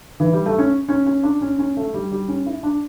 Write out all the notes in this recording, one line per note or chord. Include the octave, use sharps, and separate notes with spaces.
E3
G3
A3
C#4
C#4
C#4
D4
C#4
C#4
A3
G3
G3
C#4
E4
D4